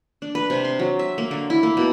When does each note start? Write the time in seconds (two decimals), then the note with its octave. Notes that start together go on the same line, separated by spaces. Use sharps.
0.22 D4
0.35 B4
0.50 C3
0.65 C6
0.79 F#3
0.99 E5
1.18 A#3
1.31 D3
1.50 E4
1.63 A#3
1.77 B2